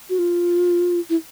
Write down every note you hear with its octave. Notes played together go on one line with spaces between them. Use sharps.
F#4
F4
E4